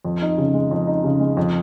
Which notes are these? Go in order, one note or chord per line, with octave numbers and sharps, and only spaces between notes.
F2
D#4
C#3
G#3
F2
D#4
C#3
G#3
F2